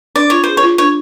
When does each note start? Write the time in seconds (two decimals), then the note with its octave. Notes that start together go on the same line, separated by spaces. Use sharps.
0.16 D4 D5
0.30 F4 C#5
0.44 G#4 C5
0.57 C#5
0.63 F4
0.78 D4 C#5